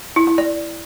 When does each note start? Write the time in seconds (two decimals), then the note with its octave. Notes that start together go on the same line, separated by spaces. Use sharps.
0.16 E4
0.27 E4
0.38 D5